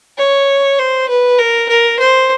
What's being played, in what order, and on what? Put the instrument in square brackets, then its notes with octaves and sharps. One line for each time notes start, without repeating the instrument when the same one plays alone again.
[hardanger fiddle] C#5
C5
B4
A#4
A#4
C5